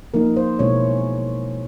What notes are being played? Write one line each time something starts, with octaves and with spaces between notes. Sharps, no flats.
F3 A#3 D#4 A#4
C5
B2 G#3 C#4 E4 C#5